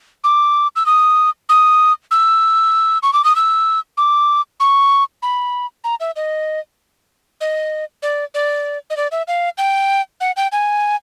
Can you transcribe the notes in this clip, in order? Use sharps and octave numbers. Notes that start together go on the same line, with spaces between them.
D6
E6
D#6
D#6
E6
C#6
D6
D#6
E6
D6
C#6
B5
A#5
E5
D#5
D#5
D5
D5
D#5
D5
E5
F5
G5
F#5
G5
G#5